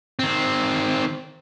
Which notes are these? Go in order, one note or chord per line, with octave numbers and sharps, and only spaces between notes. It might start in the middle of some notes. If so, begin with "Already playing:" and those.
D#3 C4